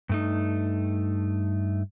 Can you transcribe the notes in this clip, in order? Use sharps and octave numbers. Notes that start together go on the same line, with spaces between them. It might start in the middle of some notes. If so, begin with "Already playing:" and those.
G2 A3 D#4